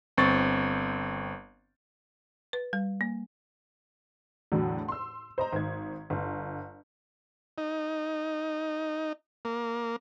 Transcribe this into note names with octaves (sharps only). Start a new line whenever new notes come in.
G1 C4 C#6 A6
B4
G3
A#3
E2 A2 D3 F#3
C6 E6
C5 D#5 A#5
G#1 G#6
G1
D#4
A#3